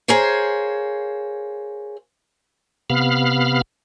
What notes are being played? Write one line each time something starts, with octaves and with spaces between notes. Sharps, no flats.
G#4 A#4 C5 C#5 F5
C3 B3 F5 B5 F6